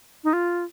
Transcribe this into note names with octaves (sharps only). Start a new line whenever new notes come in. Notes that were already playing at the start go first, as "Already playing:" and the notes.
D#4
F4